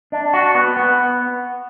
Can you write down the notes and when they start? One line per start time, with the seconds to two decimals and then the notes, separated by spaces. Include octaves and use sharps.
0.12 D4
0.33 F#4
0.55 B3
0.77 B3